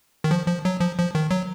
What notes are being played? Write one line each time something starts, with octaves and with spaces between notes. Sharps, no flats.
D#3
F3
F3
F#3
F3
F3
D#3
F#3